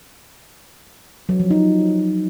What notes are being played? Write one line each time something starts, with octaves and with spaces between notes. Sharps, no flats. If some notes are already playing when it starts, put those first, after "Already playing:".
F#3
F3
D#4